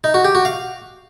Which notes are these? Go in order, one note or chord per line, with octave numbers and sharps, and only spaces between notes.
D#4
F#4
G4
F#4
F5